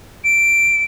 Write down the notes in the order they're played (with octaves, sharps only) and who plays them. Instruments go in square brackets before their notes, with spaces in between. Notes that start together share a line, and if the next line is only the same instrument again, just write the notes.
[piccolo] D7